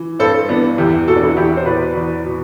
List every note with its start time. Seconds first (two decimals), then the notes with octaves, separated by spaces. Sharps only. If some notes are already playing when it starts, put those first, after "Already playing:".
Already playing: E3
0.19 G2 A4 C5
0.49 E3 B3 D4
0.78 E2 E4 G4
1.07 B2 F#4 A4
1.16 D4
1.23 E4
1.30 F#4
1.37 E2 E4 G4
1.57 C5
1.66 B2 B4 D5
1.95 E2
2.25 B2